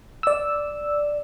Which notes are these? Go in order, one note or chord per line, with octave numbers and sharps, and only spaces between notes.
D5 E6